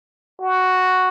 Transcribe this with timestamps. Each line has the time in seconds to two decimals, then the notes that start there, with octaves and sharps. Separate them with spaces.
0.41 F#4